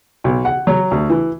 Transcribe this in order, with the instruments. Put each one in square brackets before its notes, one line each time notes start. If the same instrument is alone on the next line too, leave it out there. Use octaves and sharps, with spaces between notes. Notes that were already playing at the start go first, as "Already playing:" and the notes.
[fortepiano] B1
F#5
F#3
D2
E3